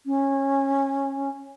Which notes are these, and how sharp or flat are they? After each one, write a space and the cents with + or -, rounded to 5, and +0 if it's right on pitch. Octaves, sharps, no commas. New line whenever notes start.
C#4 -20